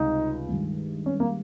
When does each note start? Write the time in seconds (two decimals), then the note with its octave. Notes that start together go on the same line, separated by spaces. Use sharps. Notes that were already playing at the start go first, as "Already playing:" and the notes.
Already playing: C#2 C3 G3 D#4
0.49 G2 D#3 G#3
1.06 C#4
1.20 A#3